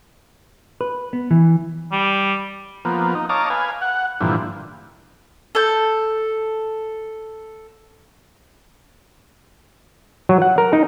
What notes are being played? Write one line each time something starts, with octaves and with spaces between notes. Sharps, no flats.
B4
B3
E3
G3
F3 A#3 B3
D#4
C#5 D#5 F5 A5 A#5 D6
B4 F5 G#5
F#5
G2 A#2 D3 E3 F3
A4 G6
F#3
F#5
A#4
D#4